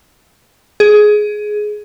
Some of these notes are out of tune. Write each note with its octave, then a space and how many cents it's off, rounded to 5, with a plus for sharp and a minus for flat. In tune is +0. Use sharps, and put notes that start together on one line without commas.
G#4 +15